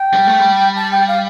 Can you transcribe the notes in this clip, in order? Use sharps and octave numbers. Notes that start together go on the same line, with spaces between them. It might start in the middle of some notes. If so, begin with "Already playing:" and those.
Already playing: G5
G3
A3
G3
A5
G5
F5